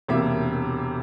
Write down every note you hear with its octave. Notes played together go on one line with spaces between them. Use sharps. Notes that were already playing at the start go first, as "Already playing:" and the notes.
E1 C3 A#3 E4 E5